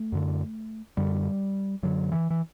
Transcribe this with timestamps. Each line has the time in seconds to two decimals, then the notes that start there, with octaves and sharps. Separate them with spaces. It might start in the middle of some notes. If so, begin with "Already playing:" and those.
Already playing: A3
0.12 F#2 D3
0.97 F#2 D3 G3
1.83 F#2 D3 F#3
2.12 E3
2.30 E3